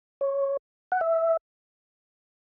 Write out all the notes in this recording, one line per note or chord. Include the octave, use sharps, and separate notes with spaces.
C#5
F#5
E5